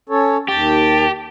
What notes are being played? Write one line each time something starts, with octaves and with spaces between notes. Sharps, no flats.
C#4 A4 C#5
D#2 G4 A5